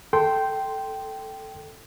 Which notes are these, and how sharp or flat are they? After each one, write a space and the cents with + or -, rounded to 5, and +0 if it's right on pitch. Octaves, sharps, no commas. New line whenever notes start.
A4 +0 G5 -10 C6 +0